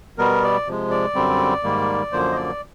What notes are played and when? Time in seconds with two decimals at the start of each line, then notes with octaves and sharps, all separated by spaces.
0.18 B2 G3 B3 A#4
0.43 D5
0.67 C3 F3 G#3
0.91 D5
1.15 F#2 D3 G3 C4
1.64 G#2 D#3 G3 A#3
2.12 F#2 D3 F3 A#3 C5
2.32 D#5
2.36 D5